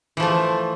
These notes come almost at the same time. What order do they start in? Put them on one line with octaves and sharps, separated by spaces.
E3 F3 A3